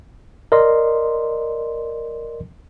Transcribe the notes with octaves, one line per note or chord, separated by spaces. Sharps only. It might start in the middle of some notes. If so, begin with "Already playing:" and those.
A#4 D5 D#5 C6